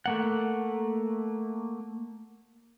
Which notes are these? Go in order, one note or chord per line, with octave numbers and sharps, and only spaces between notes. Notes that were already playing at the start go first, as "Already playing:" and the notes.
A3 A#3 F#5